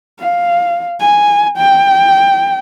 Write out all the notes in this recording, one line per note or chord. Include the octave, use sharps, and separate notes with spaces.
F5
G#5
G5